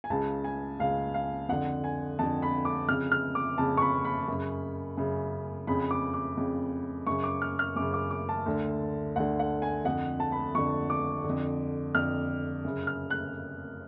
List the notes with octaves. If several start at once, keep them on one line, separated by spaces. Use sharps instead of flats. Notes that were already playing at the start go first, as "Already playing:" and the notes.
G#5
C#2 C#3 A5
G#5
C#2 C#3 F5
F5
F2 D3 F#5
G#5
F2 D3 A5
B5
D6
F2 C#3 F6
F6
D6
F2 C#3 A5
C#6
B5
B5
F#2 C#3
F#2 C#3
F2 C#3 B5
D6
D6
F2 C#3
F#2 C#3 C#6
D6
F6
F6
F#2 C#3 D6
D6
D6
A5
D2 D3
D2 D3 F#5
F#5
G#5
F2 D3 F#5
A5
B5
F2 D3 C#6
D6
D3
F2
F2 D3 F6
F#2 C#3
F6
F#6